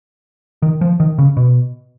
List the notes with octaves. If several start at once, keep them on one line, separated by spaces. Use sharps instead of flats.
D#3
F3
D#3
C#3
B2